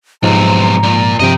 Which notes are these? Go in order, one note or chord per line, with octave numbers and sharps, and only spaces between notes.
B1 G#2 C3 F3 G#3 A#5
A#2
G2 C3 F3 D#5 G5